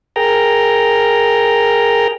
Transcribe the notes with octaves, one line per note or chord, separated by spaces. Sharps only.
G#4 A#4 G5 A#5